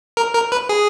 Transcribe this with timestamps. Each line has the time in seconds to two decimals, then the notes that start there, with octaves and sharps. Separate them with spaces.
0.17 A#4
0.34 A#4
0.52 B4
0.69 G#4